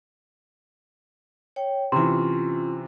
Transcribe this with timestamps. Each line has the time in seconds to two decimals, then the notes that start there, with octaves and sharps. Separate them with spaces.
1.56 C#5 G5
1.92 C3 E3 C#4 F4 C6